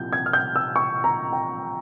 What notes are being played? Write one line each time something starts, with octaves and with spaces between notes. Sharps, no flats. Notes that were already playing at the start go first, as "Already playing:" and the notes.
Already playing: C2 A#2 F3 G6
G#6
F6
G6
E6
C#6
A#5
G5